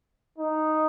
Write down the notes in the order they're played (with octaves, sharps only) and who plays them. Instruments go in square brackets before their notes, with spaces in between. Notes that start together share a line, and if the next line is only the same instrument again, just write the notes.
[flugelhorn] D#4